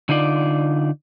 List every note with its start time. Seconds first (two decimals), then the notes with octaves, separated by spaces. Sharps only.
0.09 D3 D#4 F4 D5